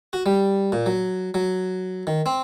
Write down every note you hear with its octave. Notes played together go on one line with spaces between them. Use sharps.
F#4
G3
A#2
F#3
F#3
D#3
C4